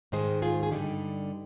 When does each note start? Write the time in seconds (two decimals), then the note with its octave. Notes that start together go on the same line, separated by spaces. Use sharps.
0.12 G#2 D#3 G#3 G#4 C5
0.42 F4 G#4
0.63 G#4
0.72 G2 D3 G3 D#4 G4